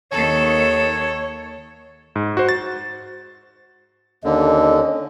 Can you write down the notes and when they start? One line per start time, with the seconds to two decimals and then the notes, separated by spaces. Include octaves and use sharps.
0.12 D#2 D#3 A4 C#5
2.16 G#2
2.37 F#4 C5
2.49 A6
4.24 D#2 D3 C#4 A4 D#5